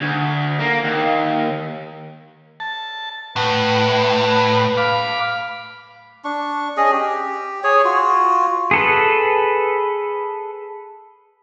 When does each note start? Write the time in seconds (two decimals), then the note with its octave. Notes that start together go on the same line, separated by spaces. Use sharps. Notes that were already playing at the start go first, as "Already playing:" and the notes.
0.01 D2
0.60 A#3
0.85 D#2
2.60 A5
3.36 A2 B4 F#5
4.77 F5 B5 D6
6.24 D4 C#6
6.77 C#4 G#4 D#5
6.92 G4
7.64 G#4 C#5
7.85 F4 F#4
8.71 G#4 A4 B4